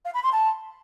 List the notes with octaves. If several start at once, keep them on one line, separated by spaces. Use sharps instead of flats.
F5
B5
C6
A5